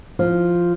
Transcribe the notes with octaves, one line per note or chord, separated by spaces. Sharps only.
F3